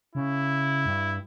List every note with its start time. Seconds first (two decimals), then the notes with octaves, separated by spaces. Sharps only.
0.15 C#3 E4
0.86 G2